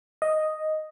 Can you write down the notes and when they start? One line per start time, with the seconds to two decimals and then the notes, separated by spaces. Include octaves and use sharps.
0.22 D#5